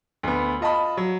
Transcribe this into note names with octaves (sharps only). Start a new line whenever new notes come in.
D2 B3
F4 D#5 A5 B5
F#3